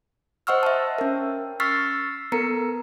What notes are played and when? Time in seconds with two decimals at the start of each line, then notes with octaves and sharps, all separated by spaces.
0.47 C5 D#5 F#5 C#6 E6 F6
0.63 E5 A5
0.98 C#4 A#4
1.60 C#6 E6 F6 A6 B6 C7
2.32 B3 A4 A#4 A#5 C#7